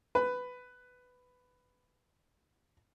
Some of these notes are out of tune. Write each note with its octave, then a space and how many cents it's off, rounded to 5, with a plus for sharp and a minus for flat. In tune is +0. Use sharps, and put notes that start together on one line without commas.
B4 +10